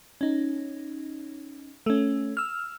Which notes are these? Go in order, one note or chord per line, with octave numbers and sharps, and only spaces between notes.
C#4 D#4
A3 C#4
E6 F6